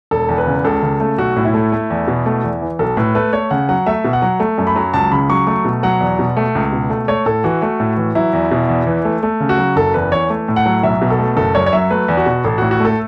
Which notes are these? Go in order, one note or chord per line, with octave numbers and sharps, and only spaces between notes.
E1 A4
E2
B4
C#3
C#2 A4
C#3
A3
B1 F#4
A2
E4
A3
A3
E2
B2
A3
E2
E3
B1 A4
A2 B4
A3 B4
A3 C#5
C#3 F#5
F#3 F#5
A3 E5
B2
F#5
F#3
A3
F#2
B5
F#3
C#2 A5
C#3 B5
F#3 C#6
A3 C#6
B2
F#3 F#5
E2
B2
A3
C#2
B2
A3
A3 C#5
A2 A4
E3 F#4
A3
A2
E3
F#3 E4
E2
B2
E2
E3
A3
A3
C#3
F#4
F#3
F#1 A4
E2 B4
E3 C#5
A3
A2
F#5
F#3
B1 E5
B2
A4
A3
F#1 A4
F#2 C#5
C#5
F#3 E5
A3 B4
E2
F#4
B2
A1 A4
A2 F#4
F#4
A3
A4